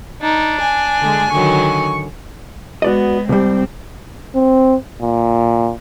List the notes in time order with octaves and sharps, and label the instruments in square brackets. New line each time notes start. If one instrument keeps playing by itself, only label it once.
[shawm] D4 [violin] D#4
[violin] G#5
[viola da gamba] D3 G#3
[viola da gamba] D3 D#3 F#3 [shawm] C#6
[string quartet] G#3 B3 [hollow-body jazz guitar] F#4 D5 D#5
[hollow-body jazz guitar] C2 G3 [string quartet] C4
[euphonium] C4
A#2